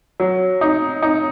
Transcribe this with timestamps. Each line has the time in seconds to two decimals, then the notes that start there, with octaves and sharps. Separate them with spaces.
0.20 F#3
0.61 D#4
1.02 D#4